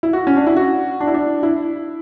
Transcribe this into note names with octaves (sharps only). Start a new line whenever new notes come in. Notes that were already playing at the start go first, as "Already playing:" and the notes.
E4
F#4
C#4
D4
E4
F#4
D4
E4
D4
E4